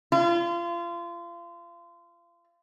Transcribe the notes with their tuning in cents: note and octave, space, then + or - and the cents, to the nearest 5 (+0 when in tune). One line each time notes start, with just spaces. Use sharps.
F4 -30